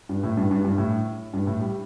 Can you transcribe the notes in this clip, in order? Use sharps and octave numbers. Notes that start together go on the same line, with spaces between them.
G2
A2
G2
G2
G2
A2
G2
A2
G3